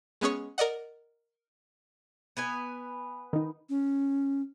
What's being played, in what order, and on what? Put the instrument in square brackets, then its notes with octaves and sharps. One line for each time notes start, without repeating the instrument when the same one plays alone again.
[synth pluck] G#3 B3 C#4 G#4 C#5
A#4 D5 D#5 F#5
[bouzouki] B3 B4 G#5
[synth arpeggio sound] D#3 D#4
[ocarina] C#4